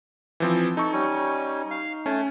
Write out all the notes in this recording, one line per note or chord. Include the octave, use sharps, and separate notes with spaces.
E3 F3 C4
D#4 A4 C#6
G3 C#4 G#5
F5
A3 C#4 G#5 A5